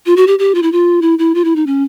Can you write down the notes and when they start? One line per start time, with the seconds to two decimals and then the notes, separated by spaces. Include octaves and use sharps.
0.06 F4
0.16 F#4
0.27 G4
0.39 G4
0.55 F4
0.63 E4
0.72 F4
1.02 E4
1.19 E4
1.35 F4
1.44 E4
1.56 D#4
1.66 C#4